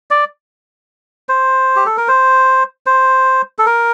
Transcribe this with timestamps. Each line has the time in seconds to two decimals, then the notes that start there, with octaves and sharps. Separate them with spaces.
0.11 D5
1.29 C5
1.76 G4
1.86 A4
1.97 A#4
2.08 C5
2.86 C5
3.59 A4
3.66 A#4